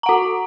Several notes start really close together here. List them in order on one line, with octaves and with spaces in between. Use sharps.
A#5 F#5 F#4